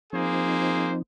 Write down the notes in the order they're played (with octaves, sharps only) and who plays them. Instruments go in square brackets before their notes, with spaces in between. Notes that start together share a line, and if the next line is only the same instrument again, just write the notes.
[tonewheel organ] F3 C4 D#4 [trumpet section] A#3 G#4 C5